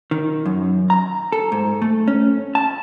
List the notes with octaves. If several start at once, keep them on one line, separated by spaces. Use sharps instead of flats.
D#3
F#2
A#5
A4
G#2
A3
C#4
A5